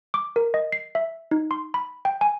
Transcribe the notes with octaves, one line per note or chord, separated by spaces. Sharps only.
D6
A#4
D#5
C7
E5
D#4
C6
B5
G5
G#5